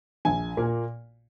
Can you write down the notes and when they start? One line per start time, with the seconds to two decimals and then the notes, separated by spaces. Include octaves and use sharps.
0.25 A#1 G#5
0.57 A#2 A#3